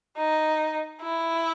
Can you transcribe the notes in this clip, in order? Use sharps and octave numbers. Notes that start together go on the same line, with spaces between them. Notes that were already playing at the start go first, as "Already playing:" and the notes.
D#4
E4